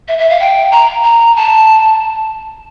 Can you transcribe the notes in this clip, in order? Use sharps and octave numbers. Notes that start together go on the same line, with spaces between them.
E5
E5
F5
G5
A#5
A#5
A5